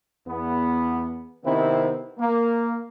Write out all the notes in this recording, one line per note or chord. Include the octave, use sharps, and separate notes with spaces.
E2 B3
C3 D#3 B3 C4 E4
A#3